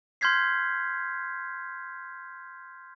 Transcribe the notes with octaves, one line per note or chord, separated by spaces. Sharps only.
C6 F6 G6 G#6 B6 C7